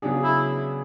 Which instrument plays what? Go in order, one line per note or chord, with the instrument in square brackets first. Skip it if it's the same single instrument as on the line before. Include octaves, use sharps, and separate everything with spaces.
[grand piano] C#3 F#3 B3 D4 G#4
[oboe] E4